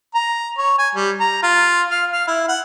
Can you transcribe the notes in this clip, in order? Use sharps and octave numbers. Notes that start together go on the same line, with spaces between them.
A#5
C#5
G#5
G3
A#5
F4
F5
F5
E4
F#5